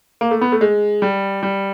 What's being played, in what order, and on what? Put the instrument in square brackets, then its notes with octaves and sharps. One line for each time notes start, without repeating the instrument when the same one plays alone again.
[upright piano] A#3
A3
B3
A3
G#3
G3
G3